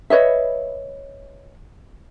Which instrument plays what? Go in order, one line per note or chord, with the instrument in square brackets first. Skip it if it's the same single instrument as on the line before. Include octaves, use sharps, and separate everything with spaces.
[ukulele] B4 C#5 D#5 E5